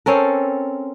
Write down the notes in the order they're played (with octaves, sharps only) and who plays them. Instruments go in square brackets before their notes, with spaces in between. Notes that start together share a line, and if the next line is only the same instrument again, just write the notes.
[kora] C4 C#4 A4 A#4